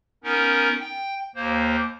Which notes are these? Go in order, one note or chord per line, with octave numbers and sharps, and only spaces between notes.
B3 C#4 D#4 A#4
G5
D#2 A#3 C5